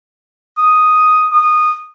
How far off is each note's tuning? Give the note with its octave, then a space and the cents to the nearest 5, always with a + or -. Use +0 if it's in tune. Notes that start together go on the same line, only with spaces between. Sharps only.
D#6 +0
D#6 -15